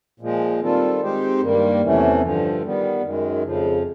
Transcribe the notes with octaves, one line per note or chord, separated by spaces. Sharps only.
A#2 F3 G#3
D#3 G3 C4 F4 A4
G#3 C4 D#4 G4 C5
G2 D#3 G3 A#3
E2 C3 E3 A3 C#4
G2 D3 F3
D#3 G3 B3
F#2 D#3 G#3
F2 C#3 F3